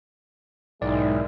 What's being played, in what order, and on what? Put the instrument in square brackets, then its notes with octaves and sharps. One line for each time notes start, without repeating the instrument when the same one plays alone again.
[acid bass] B1 [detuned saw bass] G#2 [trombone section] D#3 G#3 E4 [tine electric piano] D5